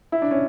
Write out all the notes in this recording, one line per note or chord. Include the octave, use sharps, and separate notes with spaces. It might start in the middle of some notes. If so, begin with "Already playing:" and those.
E4
D4
C#4